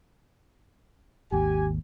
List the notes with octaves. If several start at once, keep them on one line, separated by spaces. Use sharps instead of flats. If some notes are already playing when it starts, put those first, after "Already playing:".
G#1 D#2 G4 G#5